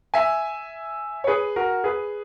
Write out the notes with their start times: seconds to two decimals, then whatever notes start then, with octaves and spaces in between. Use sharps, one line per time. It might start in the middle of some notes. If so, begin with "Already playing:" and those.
0.14 E5 G#5
1.24 C#5
1.27 G#4 B4
1.56 F#4 A#4
1.84 G#4 B4